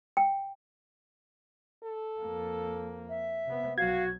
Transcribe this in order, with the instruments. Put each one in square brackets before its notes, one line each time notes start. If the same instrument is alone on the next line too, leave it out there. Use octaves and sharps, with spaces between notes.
[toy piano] G5
[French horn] A4
[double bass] F2 A#3
[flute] E5
[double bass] C3 B3
[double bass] B1 F#3 [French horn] F#4 [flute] F5 [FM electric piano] G#6